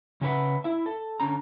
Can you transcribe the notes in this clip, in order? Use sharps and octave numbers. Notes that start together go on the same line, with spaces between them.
C#3 C#4 F#4 B4 E5 F#5
E4 E5
A4
D3 C#4 A#5